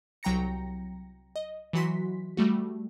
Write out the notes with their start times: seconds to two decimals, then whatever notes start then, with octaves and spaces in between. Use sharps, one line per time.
0.23 C2 F#3 G5 A#5 A#6 C#7
1.36 D#5
1.73 E3 F#3 F#4 C6 B6
2.37 G3 A3 F#4